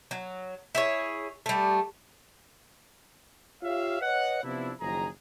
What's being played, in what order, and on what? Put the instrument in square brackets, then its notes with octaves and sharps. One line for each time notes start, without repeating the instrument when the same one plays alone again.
[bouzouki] F#3
E4 G#4 C#5
G3 A3
[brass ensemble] F4 G4 C#5 E5 F5
B4 C#5 D#5 F#5
C3 F3 B3 D4 E4
F#1 D#3 F3 G#4 A#5